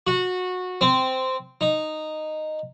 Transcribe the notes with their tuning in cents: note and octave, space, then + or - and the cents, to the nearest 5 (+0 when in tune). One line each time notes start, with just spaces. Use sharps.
F#4 -20
C4 -10
D#4 -10